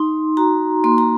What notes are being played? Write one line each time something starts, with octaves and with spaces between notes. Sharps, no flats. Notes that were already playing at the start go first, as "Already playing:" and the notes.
Already playing: D#4 C6
F#4 A#5
A#3 C6
A#5